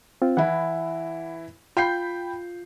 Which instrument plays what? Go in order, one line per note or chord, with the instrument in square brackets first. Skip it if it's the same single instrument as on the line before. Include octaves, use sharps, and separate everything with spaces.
[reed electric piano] C4 F4
[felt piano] E3 E4 [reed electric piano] F#5
[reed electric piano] F4 G6 [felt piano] G5 B5 C7